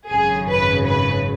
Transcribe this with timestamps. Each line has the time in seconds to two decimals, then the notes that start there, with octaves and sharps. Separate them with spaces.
0.11 G#1 F#2 C#3 G#4
0.49 B4
0.88 B4